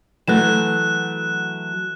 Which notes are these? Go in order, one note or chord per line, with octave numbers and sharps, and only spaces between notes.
E3 F#3 A3 F#6 E7